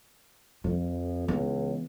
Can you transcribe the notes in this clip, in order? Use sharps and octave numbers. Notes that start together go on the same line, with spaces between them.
F2 F3
C#2 E3 B3